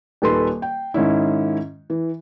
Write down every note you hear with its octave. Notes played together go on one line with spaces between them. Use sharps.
D#1 D#3 A4 B4 C6
G5
G#2 D#3 C#4 E4
E3